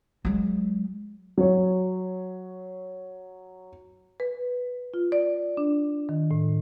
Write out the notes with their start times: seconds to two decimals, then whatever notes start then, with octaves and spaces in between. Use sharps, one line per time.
0.25 F#3 G#3
1.38 F#3 C#5
4.20 B4
4.94 F4
5.12 D5
5.57 D4
6.09 D#3
6.31 A2